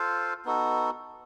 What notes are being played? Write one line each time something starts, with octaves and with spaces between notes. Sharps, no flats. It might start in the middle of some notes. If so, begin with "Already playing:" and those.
Already playing: F4 A4 C5 F5
B3 D#4 F#4 A4